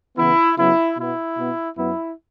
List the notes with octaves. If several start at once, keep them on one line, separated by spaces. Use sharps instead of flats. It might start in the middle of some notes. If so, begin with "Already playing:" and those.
C#3 E3 B3 E4
C#3 F#3 B3 E4
B2 B3 E4
B2 B3
F#2 F#3 B3 E4